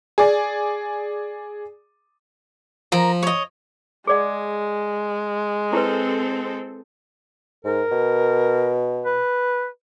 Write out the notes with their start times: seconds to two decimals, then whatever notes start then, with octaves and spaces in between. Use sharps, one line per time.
0.18 G#4 D5
2.92 F3 A#4 A#5
3.23 C#5 D#5
4.07 G#3 G#4 D5 F#5
5.73 C4 E4 A4 B4
7.65 G#2 A#4
7.91 B2
9.05 B4